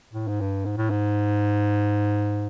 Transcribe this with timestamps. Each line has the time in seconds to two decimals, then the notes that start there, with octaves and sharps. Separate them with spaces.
0.13 A2
0.28 G#2
0.41 G2
0.65 G#2
0.77 A2
0.90 G#2